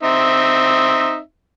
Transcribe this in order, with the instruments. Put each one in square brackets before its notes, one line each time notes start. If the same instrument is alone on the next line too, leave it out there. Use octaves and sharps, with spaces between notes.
[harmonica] C4 D#4 E5